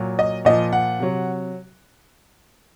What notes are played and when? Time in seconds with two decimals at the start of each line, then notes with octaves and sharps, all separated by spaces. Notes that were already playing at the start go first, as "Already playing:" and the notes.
Already playing: A#2 F#3
0.19 D#5
0.45 A#2 F3 D#5
0.73 F#5
0.99 C3 F#3